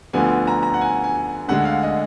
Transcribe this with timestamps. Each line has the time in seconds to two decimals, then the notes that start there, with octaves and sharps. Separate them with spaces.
0.13 D2 D3 F3 B3 G#5
0.47 A#5
0.63 A#5
0.74 F#5
0.81 G#5
1.04 G#5
1.48 D2 D3 G#3 F#5
1.65 F5
1.83 D#5